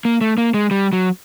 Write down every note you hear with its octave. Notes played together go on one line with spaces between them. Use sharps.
A#3
A3
A#3
G#3
G3
F#3